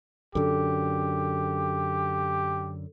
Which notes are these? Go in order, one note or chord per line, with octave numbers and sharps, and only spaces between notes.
F#2 D3 G4 A4